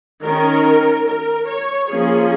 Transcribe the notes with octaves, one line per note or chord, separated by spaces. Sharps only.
D#3 C#4 A#4
A#4
C#5
F3 A#3 C#4 G#4